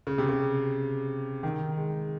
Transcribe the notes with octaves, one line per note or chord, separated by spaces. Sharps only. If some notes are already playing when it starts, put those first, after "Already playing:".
C#3
C3
C#3
D#3
G#3